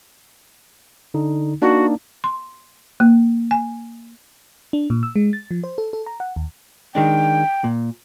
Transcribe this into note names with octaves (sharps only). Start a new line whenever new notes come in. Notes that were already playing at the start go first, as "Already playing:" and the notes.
D3 D#4
A#3 D4 D#4 F#4
C6
A#3
G#5
D4
A#2
E6
G#3
A6
F3
C5
A4
A4
A#5
F#5
D#2
D#3 G#3 D4 G5
A#2